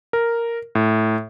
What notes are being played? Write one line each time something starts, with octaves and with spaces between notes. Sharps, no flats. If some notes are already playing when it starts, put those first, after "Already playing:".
A#4
A2